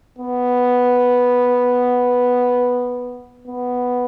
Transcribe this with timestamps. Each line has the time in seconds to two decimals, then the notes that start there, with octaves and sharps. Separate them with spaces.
0.18 B3
3.48 B3